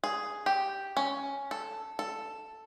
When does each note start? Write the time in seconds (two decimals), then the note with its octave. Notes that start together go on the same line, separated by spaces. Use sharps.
0.04 G#4
0.46 G4
0.97 C#4
1.51 A4
1.99 A4